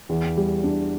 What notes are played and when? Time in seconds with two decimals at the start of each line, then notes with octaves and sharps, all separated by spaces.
0.09 E2
0.37 G3
0.64 D4